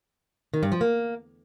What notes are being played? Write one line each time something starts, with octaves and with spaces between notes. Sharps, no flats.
D#3
G2
F3
A#3